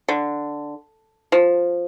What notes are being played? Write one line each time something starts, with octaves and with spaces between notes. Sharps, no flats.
D3
F3